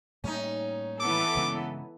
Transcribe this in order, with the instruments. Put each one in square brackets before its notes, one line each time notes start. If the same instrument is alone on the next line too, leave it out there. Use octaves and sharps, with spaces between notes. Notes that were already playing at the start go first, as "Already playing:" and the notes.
[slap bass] A2 G3 A#3 [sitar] C#4 D#4
[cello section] E3 B3 A4 [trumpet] D6
[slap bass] G2 C#3 G#3